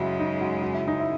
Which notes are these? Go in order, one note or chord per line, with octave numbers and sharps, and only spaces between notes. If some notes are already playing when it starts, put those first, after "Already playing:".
Already playing: F#2 C#3 G#3 E4 F#4
D#4
F#4
F#4
E4
D#4
E4